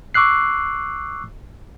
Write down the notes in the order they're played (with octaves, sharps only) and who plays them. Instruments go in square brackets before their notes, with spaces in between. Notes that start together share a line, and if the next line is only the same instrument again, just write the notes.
[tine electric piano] C#6 D6 E6 F#6 C7